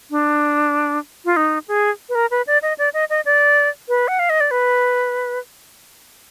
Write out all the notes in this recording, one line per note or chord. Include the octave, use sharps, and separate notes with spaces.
D4
F4
D#4
G#4
B4
A#4
B4
D5
D#5
D5
D#5
D#5
D5
B4
F#5
F5
D#5
D5
B4